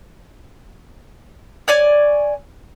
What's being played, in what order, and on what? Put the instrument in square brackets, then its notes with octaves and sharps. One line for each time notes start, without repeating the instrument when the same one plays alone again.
[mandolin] C#5 D5 G#5